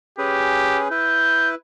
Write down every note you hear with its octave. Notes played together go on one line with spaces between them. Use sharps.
C#4 G4 G#4 B4
E4 B4 G6